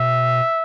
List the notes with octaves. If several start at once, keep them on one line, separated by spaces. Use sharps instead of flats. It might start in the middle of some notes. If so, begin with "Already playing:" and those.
Already playing: B2 E5